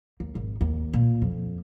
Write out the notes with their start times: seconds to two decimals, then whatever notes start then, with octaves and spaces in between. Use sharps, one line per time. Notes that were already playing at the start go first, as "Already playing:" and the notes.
0.20 D#2
0.35 G#1
0.61 D#2
0.93 A#2
1.22 F2